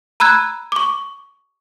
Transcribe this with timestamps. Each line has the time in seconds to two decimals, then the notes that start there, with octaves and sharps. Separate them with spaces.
0.20 A#5 B5 E6 F#6 G#6
0.72 C#6 D6